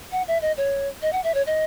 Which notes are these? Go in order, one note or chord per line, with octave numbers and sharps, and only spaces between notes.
F#5
E5
D#5
C#5
D#5
F#5
E5
C#5
D#5